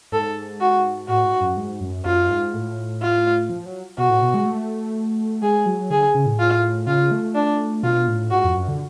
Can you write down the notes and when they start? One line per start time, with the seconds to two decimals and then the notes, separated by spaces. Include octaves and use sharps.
0.12 G#2 A4
0.60 F#4
1.08 A2 F#4
1.25 G#2
1.41 F#2
1.57 G#2
1.80 F#2
2.05 F#2 F4
2.30 G#2
2.54 A2
3.02 F4
3.50 F3
3.66 F#3
3.98 B2 F#4
4.10 A2
4.22 B2
4.34 G#3
4.46 A3
5.42 G#3 G#4
5.66 F#3
5.91 D3 G#4
6.15 C#3
6.26 A2
6.39 F4
6.87 C#3 F4
7.11 A3
7.35 D4
7.83 B2 F4
8.08 A2
8.31 G#2 F#4
8.44 F2
8.55 F#2
8.68 D3